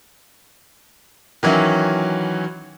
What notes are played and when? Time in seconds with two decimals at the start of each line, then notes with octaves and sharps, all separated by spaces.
1.43 D#3 E3 F#3 C#4 E4